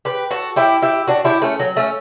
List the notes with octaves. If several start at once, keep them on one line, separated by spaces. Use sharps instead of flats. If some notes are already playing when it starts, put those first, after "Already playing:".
G4 B4
F#4 A4
E4 G4
E4 G4
D4 F#4
E4 G4
A3 C#4
F#3
A3 C#4